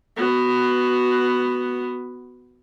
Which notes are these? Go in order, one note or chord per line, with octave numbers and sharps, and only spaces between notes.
B3 F#4